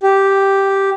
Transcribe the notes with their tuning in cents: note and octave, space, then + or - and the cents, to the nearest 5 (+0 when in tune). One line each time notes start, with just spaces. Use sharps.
G4 -5